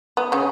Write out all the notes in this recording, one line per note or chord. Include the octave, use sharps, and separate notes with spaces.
B3
C#3 C#4